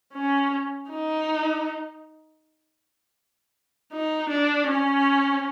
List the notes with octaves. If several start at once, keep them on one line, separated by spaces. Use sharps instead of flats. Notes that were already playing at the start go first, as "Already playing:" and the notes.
C#4
D#4
D#4
D4
C#4